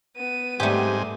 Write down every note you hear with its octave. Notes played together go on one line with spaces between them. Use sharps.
B3 D#7
G#2 G3 A3 C4 G4 G#5